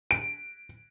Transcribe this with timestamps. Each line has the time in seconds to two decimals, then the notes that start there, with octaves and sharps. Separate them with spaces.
0.11 D7